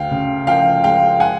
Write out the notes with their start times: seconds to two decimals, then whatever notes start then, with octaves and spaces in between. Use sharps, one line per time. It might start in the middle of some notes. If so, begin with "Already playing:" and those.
Already playing: D2 F5 G5
0.11 C#3
0.47 F3 F5 G5
0.84 G#3 F5 G5
1.20 F#5 G#5